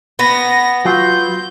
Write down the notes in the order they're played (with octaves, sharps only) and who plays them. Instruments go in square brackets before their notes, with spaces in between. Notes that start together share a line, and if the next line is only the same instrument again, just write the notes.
[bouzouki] B3 [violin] A#6
[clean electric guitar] F#3 F4 [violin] G6